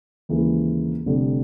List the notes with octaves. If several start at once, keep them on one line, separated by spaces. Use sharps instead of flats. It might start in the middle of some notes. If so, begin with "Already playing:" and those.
D#2 C#3 E3 G#3
F1 F2 D3 G3